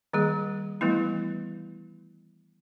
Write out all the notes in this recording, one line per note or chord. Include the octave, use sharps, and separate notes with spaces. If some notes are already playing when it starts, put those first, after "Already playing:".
D#3 G3 A#3 G#4
E3 G3 A3 B3 E4